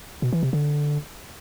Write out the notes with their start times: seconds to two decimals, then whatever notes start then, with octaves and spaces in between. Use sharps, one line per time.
0.22 B2
0.33 E3
0.43 C3
0.53 D3